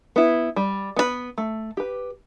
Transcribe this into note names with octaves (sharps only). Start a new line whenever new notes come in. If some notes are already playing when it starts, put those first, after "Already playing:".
B3 E4
G3
B3 D4 B4
A3
G4 B4